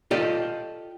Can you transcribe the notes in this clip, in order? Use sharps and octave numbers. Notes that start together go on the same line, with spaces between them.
F4 G4 A4 D5 D#5